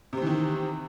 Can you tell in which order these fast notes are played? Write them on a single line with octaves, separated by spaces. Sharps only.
C3 C4 E3 D#3